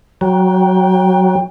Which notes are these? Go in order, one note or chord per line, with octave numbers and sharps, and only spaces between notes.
F#3 G5